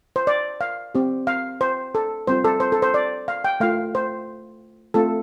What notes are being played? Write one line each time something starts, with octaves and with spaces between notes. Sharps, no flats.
C5
D5
F5
C4 G4
F5
C5
A4
G3 C4 F4 C5
A4
C5
A4
C5
D5
F5
G5
A3 F4 F5
C5
A3 C4 F4 A4